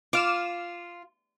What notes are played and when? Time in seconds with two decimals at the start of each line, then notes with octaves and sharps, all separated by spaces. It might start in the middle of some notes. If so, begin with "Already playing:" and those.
0.13 F4 D6 F6 E7